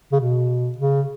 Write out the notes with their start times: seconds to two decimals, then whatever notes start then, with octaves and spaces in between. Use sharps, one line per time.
0.12 C#3
0.21 B2
0.78 C#3